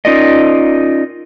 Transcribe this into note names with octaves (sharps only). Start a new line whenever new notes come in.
C#4 D#4 F4 A#4 D5 D#5